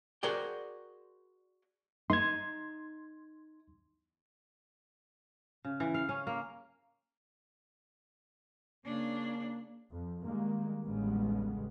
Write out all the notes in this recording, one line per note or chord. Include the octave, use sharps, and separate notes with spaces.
F#4 G#4 A#4 C5 D5 G5
D#4 C6 G#6
C#3
E3
F5
C#4
A#3
C#3 A#3 D4
F2
D#3 G3 G#3 A#3
A1 D2 C#3 G3 G#3 B3